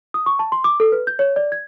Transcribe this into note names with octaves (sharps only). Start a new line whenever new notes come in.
D#6
C#6
A5
C6
D6
A4
B4
G6
C#5
D5
G#6